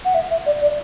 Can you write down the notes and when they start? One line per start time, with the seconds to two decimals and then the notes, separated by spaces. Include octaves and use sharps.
0.05 F#5
0.15 E5
0.30 E5
0.46 D5
0.61 D5